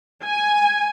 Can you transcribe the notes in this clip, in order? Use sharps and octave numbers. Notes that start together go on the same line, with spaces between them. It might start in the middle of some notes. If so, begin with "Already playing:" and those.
G#5